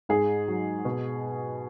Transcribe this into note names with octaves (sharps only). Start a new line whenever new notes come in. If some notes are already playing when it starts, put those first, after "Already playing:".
G#2 G#4
F#3
B2